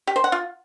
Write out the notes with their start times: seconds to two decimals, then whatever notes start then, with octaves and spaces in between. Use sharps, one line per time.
0.07 G4
0.16 C5
0.24 F#5
0.32 F4